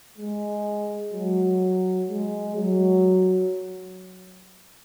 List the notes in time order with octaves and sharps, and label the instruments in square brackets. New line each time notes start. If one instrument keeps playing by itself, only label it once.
[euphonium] G#3
F#3
G#3
F#3